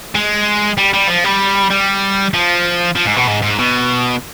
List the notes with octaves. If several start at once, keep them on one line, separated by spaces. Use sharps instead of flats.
G#3
G3
G3
F3
G3
G3
F3
F3
G#2
B2
G#2
G#2
B2